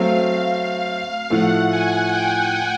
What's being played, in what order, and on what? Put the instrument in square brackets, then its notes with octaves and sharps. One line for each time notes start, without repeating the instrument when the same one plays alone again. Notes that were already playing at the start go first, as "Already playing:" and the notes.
Already playing: [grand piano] F#3 A3 C4 [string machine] F5
[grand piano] A2 F3 A3 [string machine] F#5
[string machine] G#5
G5